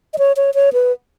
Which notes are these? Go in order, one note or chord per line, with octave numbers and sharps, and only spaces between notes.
D#5
C#5
C#5
C#5
B4